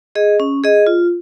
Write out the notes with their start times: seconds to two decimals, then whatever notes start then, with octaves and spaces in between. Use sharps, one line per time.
0.15 G#4 D#5
0.40 C#4
0.64 G#4 D#5
0.87 F4